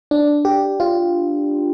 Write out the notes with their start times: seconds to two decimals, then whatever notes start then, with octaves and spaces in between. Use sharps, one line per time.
0.11 D4
0.45 G4
0.80 F4